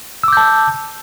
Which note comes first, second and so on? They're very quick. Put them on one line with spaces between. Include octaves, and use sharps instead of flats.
E6 D6 G6 A5